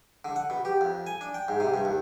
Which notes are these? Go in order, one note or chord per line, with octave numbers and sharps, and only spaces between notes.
D3
F#5
B2
G4
F2
G#5
D4
G5
G#2
C3
G2
D#2